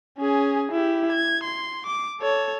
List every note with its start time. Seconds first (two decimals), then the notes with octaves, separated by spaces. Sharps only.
0.18 C#4 G#4
0.72 E4 G4
1.12 G#6
1.43 C6
1.86 D6
2.20 A4 C#5